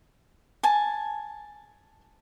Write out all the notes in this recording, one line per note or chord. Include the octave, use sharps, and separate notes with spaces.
G#5 A5